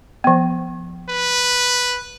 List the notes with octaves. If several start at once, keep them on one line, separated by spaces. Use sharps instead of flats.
F3 B3
B4